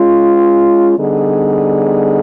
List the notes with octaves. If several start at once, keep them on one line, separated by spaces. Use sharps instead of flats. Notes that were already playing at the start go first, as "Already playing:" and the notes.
Already playing: G#3 C#4 F4
D3 G3 B3 D#4 G#4